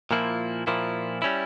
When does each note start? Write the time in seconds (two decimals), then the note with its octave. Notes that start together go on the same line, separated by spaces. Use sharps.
0.11 A#2 F3 A#3 E4
0.67 A#2 F3 A#3 E4
1.22 G3 C#4 E4